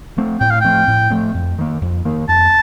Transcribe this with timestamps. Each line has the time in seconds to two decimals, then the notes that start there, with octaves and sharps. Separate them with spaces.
0.17 F3 A3 C4
0.40 A2 G5
0.50 F5
0.61 F3 A3 C4 G5
0.87 A2
1.10 F3 A3 C4
1.34 F2
1.58 D#3 A#3
1.81 F2
2.05 D#3 A#3
2.28 F2 A5